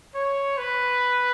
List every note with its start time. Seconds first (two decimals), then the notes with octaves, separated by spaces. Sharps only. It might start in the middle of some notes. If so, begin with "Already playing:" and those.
0.15 C#5
0.58 B4